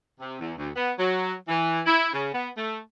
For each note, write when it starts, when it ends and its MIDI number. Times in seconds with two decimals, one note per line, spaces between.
0.20 0.36 48
0.40 0.53 40
0.58 0.69 38
0.76 0.92 59
0.99 1.34 54
1.48 1.81 52
1.86 2.08 64
2.13 2.30 49
2.33 2.49 59
2.56 2.78 57